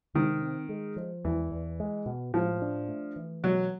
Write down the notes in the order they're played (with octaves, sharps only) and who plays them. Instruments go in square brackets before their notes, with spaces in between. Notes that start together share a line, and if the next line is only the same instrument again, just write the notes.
[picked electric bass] C3 [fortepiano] D#3
[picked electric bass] C4
G#3
F3
[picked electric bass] E2 [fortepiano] E3
[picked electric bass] E2
G#3
B2
[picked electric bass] A2 [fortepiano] F3
[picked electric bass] D4
A3
E3
[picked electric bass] B2 [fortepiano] F#3